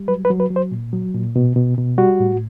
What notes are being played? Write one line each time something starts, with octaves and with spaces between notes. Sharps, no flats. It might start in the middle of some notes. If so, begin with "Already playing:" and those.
Already playing: G3
F#3 B4
B4
F#3
B4
F#3
C5
A#2
F#3
A#2
B2
B2
B2
G3 F#4
A2